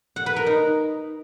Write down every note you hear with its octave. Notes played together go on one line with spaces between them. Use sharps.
F#5
B4
A#4
D#4